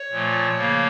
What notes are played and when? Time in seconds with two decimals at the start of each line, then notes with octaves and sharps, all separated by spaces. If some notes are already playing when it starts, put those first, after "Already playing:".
Already playing: C#5
0.11 A#2 F3 A3
0.57 C#3 F3 A#3